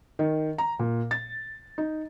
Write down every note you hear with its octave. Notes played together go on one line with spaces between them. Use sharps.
D#3
A#5
A#2
A6
D#4